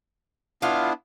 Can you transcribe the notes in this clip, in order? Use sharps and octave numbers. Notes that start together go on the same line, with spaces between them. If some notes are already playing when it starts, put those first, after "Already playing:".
B3 D4 E4 F4 F5